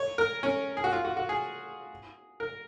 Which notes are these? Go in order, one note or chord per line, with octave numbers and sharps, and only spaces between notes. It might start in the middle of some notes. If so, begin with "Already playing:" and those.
Already playing: C#5
A#4
C#4
G#4
F#4
F4
F#4
F#4
G#4
A#4